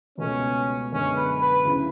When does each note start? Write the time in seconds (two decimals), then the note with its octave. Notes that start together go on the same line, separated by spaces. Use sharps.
0.18 C#2 B2 A3 C#4
0.91 F#2 D3 G#3 B3 C#4
1.16 B4
1.41 B4
1.65 D2 C#3 F#3 C#4 E4